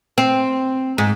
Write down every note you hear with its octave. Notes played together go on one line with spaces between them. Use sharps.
C4
G#2